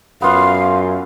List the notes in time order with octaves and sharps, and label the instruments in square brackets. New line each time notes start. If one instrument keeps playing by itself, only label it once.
[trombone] F#2 [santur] B3 F4 [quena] F5